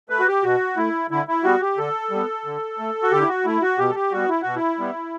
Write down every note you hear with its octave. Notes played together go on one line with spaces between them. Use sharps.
A3 B4
F#4
G4
B2 F#4
A3 E4
D3 E4
E4
G3 B3 F#4
G4
D3 A4
G3 B3
D3
A3
F#4
D3 G4
E4
F#4
A3 E4
F#4
B2 G4
A4
G4
G3 B3 F#4
E4
B2 F#4
E4
G3 B3